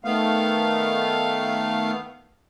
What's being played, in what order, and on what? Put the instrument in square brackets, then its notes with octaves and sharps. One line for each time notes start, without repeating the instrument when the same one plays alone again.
[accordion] D#3 A3 B3 F5